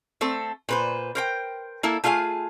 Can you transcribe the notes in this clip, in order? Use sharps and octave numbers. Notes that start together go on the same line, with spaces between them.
A3 C4 A4
A#2 B4 C5
A#4 C5 G5
A#3 E4 A4
A3 F4 G#4 F5 G#5